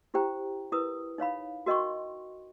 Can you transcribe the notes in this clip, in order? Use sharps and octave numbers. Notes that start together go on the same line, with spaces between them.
E4 G4 C5 G5 A#5
E4 A#4 B4 D#6
D#4 C#5 F5 B5
F#4 A#4 D#5 G5 C6 C#6